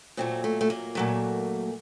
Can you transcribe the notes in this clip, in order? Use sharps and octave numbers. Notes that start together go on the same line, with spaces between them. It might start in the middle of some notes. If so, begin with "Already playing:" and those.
A#2 F#3 A3 C4
A3
A3
A#3
A#2 F#3 A3